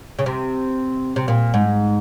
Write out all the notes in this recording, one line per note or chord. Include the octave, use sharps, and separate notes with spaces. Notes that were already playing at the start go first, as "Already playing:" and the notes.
C#3
C3
C3
A#2
G#2